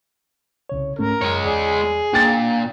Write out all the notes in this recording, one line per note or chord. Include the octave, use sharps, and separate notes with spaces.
C2 C#3 C#5
G#2 A3 C#4 A#4
F#2 G#3 C#5
E2 G#4 D5
A#2 D4 G5 A6